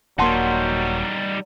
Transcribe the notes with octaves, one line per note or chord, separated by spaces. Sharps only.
D#1 F#3 G3 A#3 D#4 F#5 A5 C6